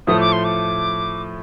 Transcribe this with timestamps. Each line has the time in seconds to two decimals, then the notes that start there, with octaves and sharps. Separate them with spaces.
0.07 A2 F3 A3 D#6
0.20 D6
0.32 C6
0.44 D6